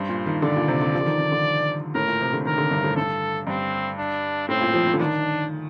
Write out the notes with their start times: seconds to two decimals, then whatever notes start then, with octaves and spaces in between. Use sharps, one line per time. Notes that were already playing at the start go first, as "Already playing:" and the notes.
Already playing: G2 C5
0.09 A#2
0.26 D#3
0.42 D3 D5
0.56 A#2
0.68 C3
0.81 D3
0.94 F3
1.01 D3
1.06 D#3
1.19 D#3
1.32 D3
1.94 A2 A#4
2.07 A#2
2.21 C3
2.33 D3
2.45 D#3 A#4
2.58 D3
2.71 G2
2.84 A2
2.96 G2 A4
3.47 G2 C4
3.98 D4
4.49 A2 C4
4.61 A#2
4.74 F3
4.87 F3
4.93 D3
4.99 D#3 D4